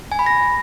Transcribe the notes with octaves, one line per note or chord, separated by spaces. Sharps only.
G#5
B5
A#6